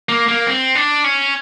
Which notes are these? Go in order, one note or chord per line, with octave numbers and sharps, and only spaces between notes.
A#3
A#3
C4
D4
C#4